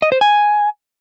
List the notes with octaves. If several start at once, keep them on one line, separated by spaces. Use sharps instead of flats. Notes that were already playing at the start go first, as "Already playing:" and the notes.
D#5
C5
G#5